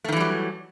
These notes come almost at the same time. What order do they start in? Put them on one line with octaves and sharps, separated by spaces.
A3 D#3 E3 G3 F#3